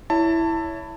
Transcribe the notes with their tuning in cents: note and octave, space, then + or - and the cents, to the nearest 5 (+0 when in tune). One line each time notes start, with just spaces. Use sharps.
E4 +0 C#5 +25 A5 +25